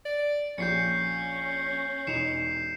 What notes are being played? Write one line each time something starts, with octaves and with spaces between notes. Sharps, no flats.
D5
A#1 C#4 G4 G6 C7 C#7
E1 D#4 C7 C#7 E7 F7